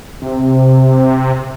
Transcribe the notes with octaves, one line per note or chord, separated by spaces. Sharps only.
C3